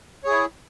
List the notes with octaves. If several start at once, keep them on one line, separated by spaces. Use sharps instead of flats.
E4 G#4 C#5